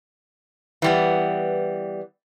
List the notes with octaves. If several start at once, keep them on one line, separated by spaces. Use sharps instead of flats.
E3 G3 B3